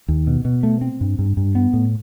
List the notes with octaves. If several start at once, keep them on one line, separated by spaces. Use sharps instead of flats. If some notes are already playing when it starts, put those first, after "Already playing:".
D#2
B2
B2
A3
C4
G2
G2
G2
B3
A2